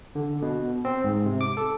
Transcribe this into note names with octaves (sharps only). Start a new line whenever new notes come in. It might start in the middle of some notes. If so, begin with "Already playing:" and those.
D3
B2
C4
G#2
C3
D6
A4